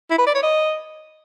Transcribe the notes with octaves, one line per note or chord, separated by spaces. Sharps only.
E4
B4
D5
C#5
D#5